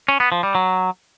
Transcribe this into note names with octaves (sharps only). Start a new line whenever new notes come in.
C#4
B3
F3
G3
F#3